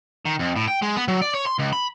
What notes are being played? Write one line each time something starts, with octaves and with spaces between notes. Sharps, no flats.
D#3
F2
A2
G5
G#3
B3
F#3
D5
C#5
C6
C#2
B5